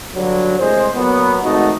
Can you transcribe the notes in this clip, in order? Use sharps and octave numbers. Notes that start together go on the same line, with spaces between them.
G2 D3 F#3
C2 A2 G#3 C5
A#2 F#3 B3
G#1 F2 A3 D#4 F#4